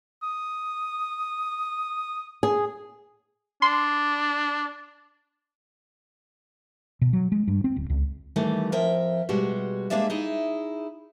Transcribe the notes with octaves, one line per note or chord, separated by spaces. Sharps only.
D#6
G#4
D4 C6
B2
F#3
G#3
G2
C4
D1
C#2
D#3 E3 G3 A3
F2 F3 A#4 E5 G5
B2 G3 G#3 F#4
G#3 A#3 D4 G#4 D5 E5
D#4 E4 G#4